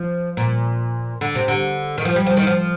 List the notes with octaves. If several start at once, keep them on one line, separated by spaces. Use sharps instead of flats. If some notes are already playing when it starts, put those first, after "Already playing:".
Already playing: F3
A#2
D3
C3
D3
D#3
F3
G3
F3
D#3
F3